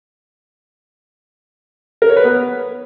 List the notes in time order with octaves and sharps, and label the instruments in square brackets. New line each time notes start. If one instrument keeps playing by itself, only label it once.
[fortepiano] A#4
C#5
B4
B3